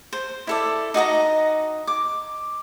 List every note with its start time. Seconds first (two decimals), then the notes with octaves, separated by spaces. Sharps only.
0.13 C5
0.47 E4 A4 D5
0.94 D#4 F#4 D#5 A#5
1.87 D6